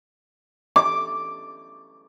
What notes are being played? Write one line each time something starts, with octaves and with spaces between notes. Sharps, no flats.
D6